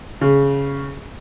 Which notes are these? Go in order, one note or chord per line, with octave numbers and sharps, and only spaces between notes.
C#3